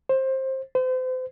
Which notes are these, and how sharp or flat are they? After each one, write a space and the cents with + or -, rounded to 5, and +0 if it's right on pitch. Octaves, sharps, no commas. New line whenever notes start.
C5 +20
C5 -35